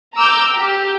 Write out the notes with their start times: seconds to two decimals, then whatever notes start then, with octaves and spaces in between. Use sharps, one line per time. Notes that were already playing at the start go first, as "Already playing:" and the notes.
0.15 A#5 D6 E6 F6 G6
0.55 G4